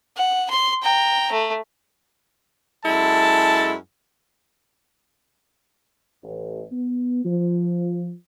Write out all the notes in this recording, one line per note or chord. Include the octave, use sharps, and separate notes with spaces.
F#5
C6
G5 A#5
A3
F#2 G#3 E4 A4 A5
A1
B3
F3